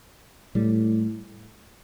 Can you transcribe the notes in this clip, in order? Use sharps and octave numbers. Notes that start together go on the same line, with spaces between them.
A2 G3